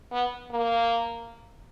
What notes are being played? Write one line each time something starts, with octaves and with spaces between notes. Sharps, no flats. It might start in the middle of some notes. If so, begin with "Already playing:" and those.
B3
A#3